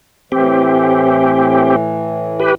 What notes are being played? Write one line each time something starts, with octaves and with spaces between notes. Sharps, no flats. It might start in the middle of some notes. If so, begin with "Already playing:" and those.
A2 E3 C4 G4
G4 B4